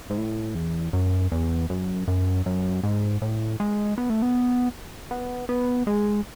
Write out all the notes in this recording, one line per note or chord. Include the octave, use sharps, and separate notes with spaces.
G#2
A2
E2
F#2
E2
F#2
F#2
F#2
G#2
A2
G#3
B3
A3
B3
B3
B3
G#3